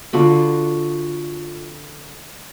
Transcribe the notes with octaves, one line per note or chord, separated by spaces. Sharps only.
D3 F4 F#4 B5